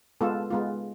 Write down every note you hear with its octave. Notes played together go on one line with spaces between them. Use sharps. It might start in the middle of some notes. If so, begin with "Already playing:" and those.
G#3 B3 F4 A4
G#3 B3 F4